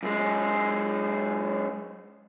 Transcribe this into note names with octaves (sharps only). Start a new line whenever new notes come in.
F#2 G#3